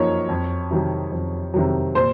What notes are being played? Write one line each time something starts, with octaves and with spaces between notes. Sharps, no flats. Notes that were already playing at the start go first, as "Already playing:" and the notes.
Already playing: F#2 F3 A#3 D#4 C#5
F2
C3 D#3 F#3
F2
C3 D#3 F#3
A#2 C5